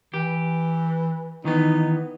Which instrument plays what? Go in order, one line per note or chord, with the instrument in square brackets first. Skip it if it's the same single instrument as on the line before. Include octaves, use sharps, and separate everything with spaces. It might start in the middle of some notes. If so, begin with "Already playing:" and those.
[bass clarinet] E3 [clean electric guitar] G4
[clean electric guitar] D#3 E3 B3 [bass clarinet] D#4